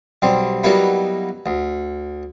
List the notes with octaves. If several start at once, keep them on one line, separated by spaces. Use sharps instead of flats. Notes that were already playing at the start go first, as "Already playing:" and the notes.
B1 G3 C4
F#3 G3 A#3 B3 D#4 E4
D2